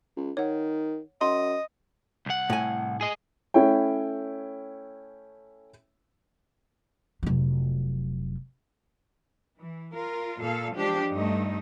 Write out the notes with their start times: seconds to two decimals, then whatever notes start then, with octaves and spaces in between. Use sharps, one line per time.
0.17 C#2
0.37 D#3 C#5 F#5
1.21 F#2 D#5 C6
2.26 C2 F#5
2.50 A2 G#5
3.01 G#4 D#5
3.54 A3 C#4 E4 C#5 G5
7.23 F1 F#3
9.58 E3
9.94 F4 A#4
10.42 A#2 A4 F5
10.76 F3 G#3 D4 G4
11.12 G2 A3 D#4